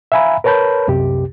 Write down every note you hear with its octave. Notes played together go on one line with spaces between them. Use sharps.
E5 F5 G#5 A#5 B5
A#4 B4 C#5 A5 B5 G6
C2 F#2 C3 G4